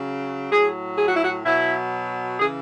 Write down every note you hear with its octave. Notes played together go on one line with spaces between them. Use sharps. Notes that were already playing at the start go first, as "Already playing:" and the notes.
Already playing: C#3 F#3
A2 F#3 G#4
G#4
F#4
E4
F#4
B2 F#3 E4
C#3 E3 G#4